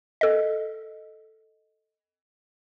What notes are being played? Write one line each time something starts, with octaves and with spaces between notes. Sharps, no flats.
A4 D#5